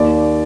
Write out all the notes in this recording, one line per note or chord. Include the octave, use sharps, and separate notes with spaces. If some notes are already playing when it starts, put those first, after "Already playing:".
Already playing: D#2 D5